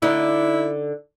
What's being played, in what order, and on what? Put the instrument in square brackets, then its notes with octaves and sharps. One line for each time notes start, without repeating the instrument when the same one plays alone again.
[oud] D3 D#4 [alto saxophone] E4